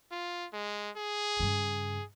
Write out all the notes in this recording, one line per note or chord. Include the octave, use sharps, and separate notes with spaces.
F4
G#3
G#4
G2 C#3